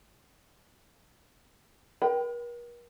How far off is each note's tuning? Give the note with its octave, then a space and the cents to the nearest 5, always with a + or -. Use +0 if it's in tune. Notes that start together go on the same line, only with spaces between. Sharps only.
A#4 +45 G5 -15 B5 +35